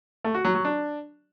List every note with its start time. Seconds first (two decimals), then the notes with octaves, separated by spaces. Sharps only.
0.24 A3
0.35 F#4
0.45 F#3
0.55 F#3
0.65 D4